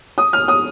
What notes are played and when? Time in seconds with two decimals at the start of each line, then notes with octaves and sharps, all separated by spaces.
0.18 D#6
0.33 F6
0.48 D#6